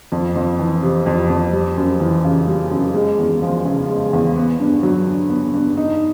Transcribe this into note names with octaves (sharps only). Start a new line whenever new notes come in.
F2
F2
E3
C3
F2
F2
G3
F#2
E3
C#3
G3
F#2
G#3
E2
F3
C#3
G#3
E2
B3
G2
F#3
D3
B3
G2
D#4